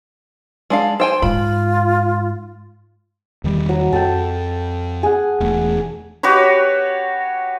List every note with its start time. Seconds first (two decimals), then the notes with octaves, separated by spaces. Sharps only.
0.70 G#3 D4 F5
1.00 C5 G5 G#5 C6
1.22 G#2 F4 B5
3.44 E2 D#3 G3
3.69 F#3
3.93 F2 A4 G5
5.03 G#4 F#5
5.40 E1 E2 A3
6.23 F#4 G4 B4 C#5